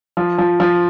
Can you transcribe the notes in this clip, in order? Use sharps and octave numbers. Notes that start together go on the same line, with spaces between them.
F3
F3
F3